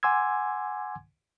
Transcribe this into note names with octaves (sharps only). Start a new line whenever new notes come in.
F#5 G#5 C6 D6 E6 G#6